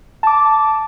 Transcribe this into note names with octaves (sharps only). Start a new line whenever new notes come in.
A5 D6